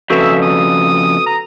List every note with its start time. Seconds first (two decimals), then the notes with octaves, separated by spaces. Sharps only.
0.10 F2 C#3 F#4 A4 B4 E5
0.43 D#6
1.26 A#5